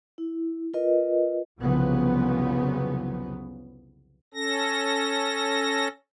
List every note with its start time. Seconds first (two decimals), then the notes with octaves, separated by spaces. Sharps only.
0.18 E4
0.74 F4 A#4 B4 D#5
1.60 C2 F2 C#3 F3 F#3 B3
4.34 C#4 A4 A#6